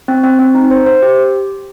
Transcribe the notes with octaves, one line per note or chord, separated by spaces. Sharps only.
C4
C4
C4
D#4
C5
C5
G4